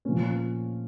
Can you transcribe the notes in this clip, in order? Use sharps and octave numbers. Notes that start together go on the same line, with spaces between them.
A#2 F3 C#4